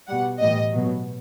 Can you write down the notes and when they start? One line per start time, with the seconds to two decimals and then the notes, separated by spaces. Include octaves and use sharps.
0.08 B2 G3 F#5
0.40 A2 E3 G3 D#5
0.73 B2 F#3